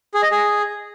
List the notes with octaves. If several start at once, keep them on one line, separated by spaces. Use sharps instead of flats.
G#4
D#5
G#4